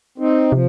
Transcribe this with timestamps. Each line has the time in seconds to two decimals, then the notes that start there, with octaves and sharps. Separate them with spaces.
0.18 C4 D#4
0.52 C3 F3